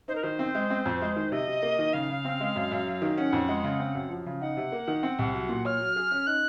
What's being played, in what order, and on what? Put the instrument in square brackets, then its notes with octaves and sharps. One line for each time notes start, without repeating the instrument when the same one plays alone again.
[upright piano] D#4 [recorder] C5
[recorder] A#4
[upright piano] D#3 [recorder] C5
[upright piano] C4
G#3
C4
F2
G#3
D#3
[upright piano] C3 [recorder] D#5
[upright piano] C3
A#3
D#3
[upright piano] C#3 [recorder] F5
[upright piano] C#3
C4
G#3
F#2
F#2
F#3
D#3
[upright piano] C#4 [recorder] F#5
[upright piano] F2
G#3
C#3
C4
F#2
F3
C#3
[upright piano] D#4 [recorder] F#5
[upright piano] C3
A#3
D#3
C4
C2
F#3
A#2
[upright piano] C#5 [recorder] F6
[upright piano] F#3
G#4
C#4
[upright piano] D#4 [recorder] F#6